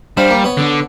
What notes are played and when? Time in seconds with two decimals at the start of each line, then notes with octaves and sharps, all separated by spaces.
0.17 G3 D4 C5 F5
0.30 A#3
0.44 B3 C#5
0.57 D3 D4